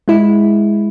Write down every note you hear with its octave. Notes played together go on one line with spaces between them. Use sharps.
G#3 E4